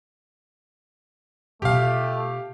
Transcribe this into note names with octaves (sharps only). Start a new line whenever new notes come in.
B2 A3 F4 G4 F5